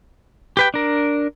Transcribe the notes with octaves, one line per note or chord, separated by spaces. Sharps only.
G4 B4 G5
D4 A#4